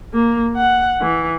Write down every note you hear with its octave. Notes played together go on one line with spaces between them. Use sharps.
A#3
F#5
E3